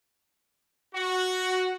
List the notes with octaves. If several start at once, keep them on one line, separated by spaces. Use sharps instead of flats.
F#4